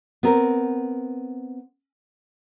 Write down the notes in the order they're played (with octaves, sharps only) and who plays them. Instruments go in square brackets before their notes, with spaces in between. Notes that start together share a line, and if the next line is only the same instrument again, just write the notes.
[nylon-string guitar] B3 C4 A#4